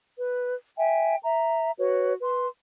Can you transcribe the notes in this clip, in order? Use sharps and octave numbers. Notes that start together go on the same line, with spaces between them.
B4
E5 G5 G#5
E5 A#5
F#4 B4 C#5
B4 C6